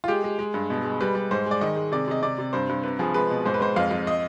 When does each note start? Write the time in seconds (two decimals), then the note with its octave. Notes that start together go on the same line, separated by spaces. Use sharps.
0.04 F4
0.08 G#3 G4
0.24 G#3
0.39 G#3
0.54 G2
0.70 B2
0.85 G#3
1.00 G3 B4
1.15 G3
1.31 G#2 C5
1.46 G#3 D5
1.61 D#3 D#5
1.76 G#3
1.92 C3 D5
2.08 C3 D#5
2.22 C3 D5
2.38 C3
2.53 G2 C5
2.69 G2
2.83 C3 B4
2.99 F3 G#4
3.14 G#3 B4
3.30 B2
3.46 G#2 C5
3.54 B4
3.60 G#2 C5
3.76 F2 F5
3.91 F2
4.07 D#5